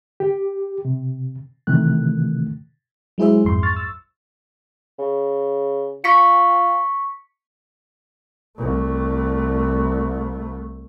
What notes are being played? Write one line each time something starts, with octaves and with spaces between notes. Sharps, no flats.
G4
C3
C3 D#3 E3 A3 F#6
F#3 G#3 E4 G#4 C5 E5
A#1 F2 G#2 C6
C#6 F6 A6
E6
C#3
F4 C#6 B6 C#7
C2 A3